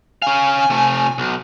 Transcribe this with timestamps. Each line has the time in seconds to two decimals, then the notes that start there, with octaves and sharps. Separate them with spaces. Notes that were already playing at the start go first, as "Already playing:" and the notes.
0.22 C#4 F5 G#5
0.70 C3 A3
1.18 B1